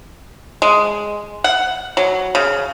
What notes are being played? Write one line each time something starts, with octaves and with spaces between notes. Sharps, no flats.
G#3
F#5
F#3
C#3